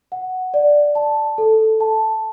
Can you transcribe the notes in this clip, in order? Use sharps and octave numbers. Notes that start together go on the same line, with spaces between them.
F#5
D5
A5
A4
A5